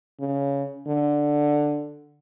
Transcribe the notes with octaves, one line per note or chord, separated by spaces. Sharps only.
C#3
D3